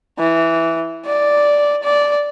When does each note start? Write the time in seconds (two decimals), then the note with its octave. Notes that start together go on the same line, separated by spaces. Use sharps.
0.19 E3
1.06 D5
1.83 D5